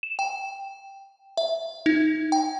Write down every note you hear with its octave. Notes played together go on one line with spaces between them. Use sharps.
E7
G5
E5
D#4
G5